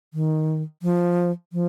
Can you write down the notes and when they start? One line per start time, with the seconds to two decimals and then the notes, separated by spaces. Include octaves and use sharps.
0.14 D#3
0.83 F3
1.53 F3